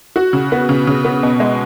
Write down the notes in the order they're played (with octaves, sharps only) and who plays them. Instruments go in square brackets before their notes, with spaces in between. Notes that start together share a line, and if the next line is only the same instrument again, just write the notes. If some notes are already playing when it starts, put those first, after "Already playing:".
[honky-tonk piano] F#4
C#3
B3
C#3
C#3
B3
B2
G#3